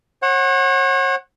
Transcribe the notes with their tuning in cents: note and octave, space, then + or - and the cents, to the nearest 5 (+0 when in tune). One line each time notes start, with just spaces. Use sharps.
C#5 -40 F#5 +0